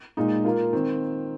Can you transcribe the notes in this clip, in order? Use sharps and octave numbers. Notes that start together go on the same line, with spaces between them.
A#2 G#3 D#4
A#3 F4 A#4
D#3 C4